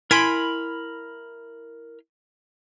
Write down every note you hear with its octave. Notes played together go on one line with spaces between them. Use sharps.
E4 A#4 G#5 B5 C6 G#6 B6 D7